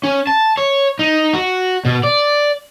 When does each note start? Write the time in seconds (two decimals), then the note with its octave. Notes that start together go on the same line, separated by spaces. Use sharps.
0.03 C#4
0.27 A5
0.57 C#5
0.99 D#4
1.33 F#4
1.85 B2
2.03 D5